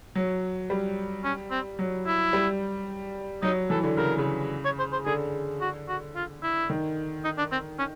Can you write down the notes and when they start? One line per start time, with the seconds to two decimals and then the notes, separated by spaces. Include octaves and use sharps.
0.15 F#3
0.70 G3
1.24 C#4
1.51 C4
1.79 F#3
2.06 E4
2.33 G3
3.43 F#3 D#4
3.70 E3 A4
3.83 D3
3.97 C#3 A#4
4.18 C#3
4.65 C#5
4.79 C5
4.93 C5
5.06 D3 G#4
5.61 F#4
5.88 F#4
6.16 F4
6.43 E4
6.70 D#3
7.24 D#4
7.38 D4
7.52 C4
7.79 C#4